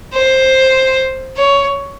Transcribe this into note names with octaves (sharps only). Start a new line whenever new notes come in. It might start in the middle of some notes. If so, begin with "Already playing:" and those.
C5
C#5